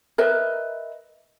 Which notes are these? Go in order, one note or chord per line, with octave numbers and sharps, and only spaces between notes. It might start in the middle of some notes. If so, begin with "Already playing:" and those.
A#4 B4 D#5 E5